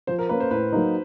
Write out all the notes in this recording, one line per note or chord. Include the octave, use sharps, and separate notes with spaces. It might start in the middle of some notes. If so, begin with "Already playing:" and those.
F3 C5
A#4
A#3 C#4 B4
C5
A2 B4
F#3 A#3 D#4